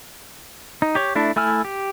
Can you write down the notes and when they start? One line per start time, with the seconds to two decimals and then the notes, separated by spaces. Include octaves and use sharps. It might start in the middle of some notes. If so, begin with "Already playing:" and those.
0.82 D#4
0.95 G4 C#5
1.15 A3 D4 E4
1.36 A3 E4 G#5 E6 F6
1.65 G4